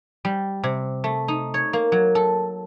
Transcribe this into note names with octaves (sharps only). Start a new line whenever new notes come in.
G3
C3
A3
D#4
C#5
A#3
F#3
A4